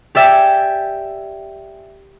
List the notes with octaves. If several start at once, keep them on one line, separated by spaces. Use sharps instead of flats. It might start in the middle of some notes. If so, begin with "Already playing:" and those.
G4 D5 E5 G5 G#5